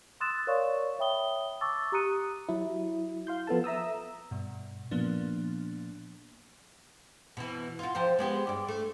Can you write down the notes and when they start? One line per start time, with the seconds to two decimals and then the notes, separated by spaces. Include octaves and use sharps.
0.20 C6 D#6 E6 F#6 A6 E7
0.47 A#4 C#5 D5 F5 C6 C#6
0.99 C#5 E5 G5 B5 D#6 G7
1.61 A5 C#6 D6 E6 A6
1.92 G4 A#5 D#6 F#6 C#7 D#7
2.49 F#3 E4
3.27 F5 C6 G6
3.47 F3 B3 A4 A5
3.64 E5 A#5 D#6 E6
4.31 G2 B2
4.91 A#2 F3 A#3 B3 D4
7.37 B2 E3
7.79 F4 F#4
7.95 F3 G4 C5
8.19 G#3 B3 G4
8.47 G2 D5
8.68 A3